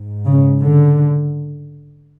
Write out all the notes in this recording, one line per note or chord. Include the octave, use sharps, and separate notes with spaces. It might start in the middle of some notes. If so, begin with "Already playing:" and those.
Already playing: G#2
C#3
D3